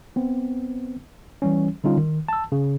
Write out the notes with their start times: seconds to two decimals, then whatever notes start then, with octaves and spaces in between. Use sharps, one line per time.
0.16 B3 C4
1.42 E3 G3 C#4
1.84 D3 G3 C#4 D#4 F4
1.97 D#3
2.28 A5 E6
2.52 C#3